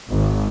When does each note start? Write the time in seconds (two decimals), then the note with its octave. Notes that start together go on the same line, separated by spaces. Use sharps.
0.11 G#1